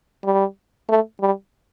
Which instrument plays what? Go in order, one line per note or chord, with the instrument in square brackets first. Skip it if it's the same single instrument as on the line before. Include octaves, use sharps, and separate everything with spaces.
[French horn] G3
A3
G3